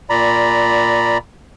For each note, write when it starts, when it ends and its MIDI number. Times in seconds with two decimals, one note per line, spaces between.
0.10 1.18 46
0.10 1.18 74
0.10 1.18 82
0.10 1.18 83